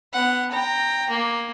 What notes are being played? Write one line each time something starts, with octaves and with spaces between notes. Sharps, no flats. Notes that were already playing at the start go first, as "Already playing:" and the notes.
B3 F#5
G5 A#5
A#3